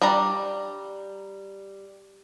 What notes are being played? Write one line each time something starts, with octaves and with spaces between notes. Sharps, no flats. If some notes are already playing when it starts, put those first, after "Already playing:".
G3 D4 D5 A#5